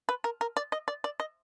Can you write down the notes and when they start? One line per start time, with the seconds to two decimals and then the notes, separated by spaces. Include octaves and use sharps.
0.09 B4
0.24 A#4
0.41 A#4
0.57 D5
0.72 D#5
0.88 D5
1.04 D5
1.20 D#5